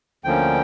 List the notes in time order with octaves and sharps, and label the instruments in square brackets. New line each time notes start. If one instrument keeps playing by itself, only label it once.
[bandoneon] D2 D3 F3 A#3 C#4 G5